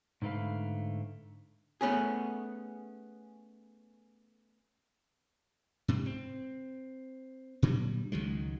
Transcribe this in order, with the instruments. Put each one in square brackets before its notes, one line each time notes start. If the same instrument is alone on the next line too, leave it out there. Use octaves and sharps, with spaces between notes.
[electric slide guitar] G#2 D3 A3 B4 F5
[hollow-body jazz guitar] A3 B3 C#4 G#4
[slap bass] G#2 C3
C4
A#2 D3 F#3 G3
C#2 D#3 F#3 G#3